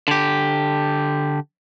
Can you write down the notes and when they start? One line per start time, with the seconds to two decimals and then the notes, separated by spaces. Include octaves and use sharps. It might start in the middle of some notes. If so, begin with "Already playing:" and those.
0.08 D3 G4